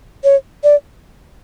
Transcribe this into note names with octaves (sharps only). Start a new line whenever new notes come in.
C#5
D5